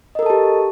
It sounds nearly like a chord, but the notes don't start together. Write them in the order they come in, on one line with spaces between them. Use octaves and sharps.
D#5 A#4 A4 A5 G4